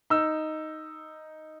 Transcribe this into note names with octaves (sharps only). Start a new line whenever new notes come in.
D#4 E6